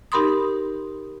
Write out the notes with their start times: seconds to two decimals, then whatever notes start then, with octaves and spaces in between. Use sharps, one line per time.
0.12 D#4 G4 A#4 B5 C6 D#6